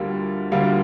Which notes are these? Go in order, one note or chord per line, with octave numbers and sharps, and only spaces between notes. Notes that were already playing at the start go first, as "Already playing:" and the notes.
Already playing: D2 D3 G3 A#3 F4
D2 D3 G3 A#3 F4